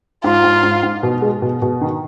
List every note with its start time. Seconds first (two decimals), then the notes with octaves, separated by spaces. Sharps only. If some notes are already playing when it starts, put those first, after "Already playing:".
0.24 G#2 F4
0.44 G#2
0.63 G#2
0.83 G#2
1.03 B2
1.22 G#3
1.42 B2
1.62 B2
1.81 D#3